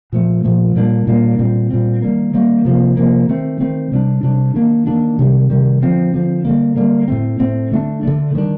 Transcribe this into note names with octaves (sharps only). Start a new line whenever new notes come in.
A#2 F3 A3
A#2 F3 A3
A#2 G3 A#3 D4
A#2 G3 A#3 D4
A#2 G3 C4
A#2 G3 C4
D#3 G3 A#3
D#3 G3 A#3
C3 F3 A#3
C3 F3 A#3
D#3 A3 C4
D#3 A3 C4
C3 G3 D4
C3 G3 D4
D#3 A#3 D4
D#3 A#3 D4
C3 D#3 G3
C3 D#3 G3
D3 F3 C4
D3 F3 C4
D3 G3 A#3
D3 G3 A#3
A2 A3 C4
A2 A3 C4
D3 A3 D4
D3 A3 D4
D#3 G3 A#3 D4